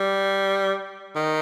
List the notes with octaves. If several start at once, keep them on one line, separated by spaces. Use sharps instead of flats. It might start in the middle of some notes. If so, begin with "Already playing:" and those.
Already playing: G3
D#3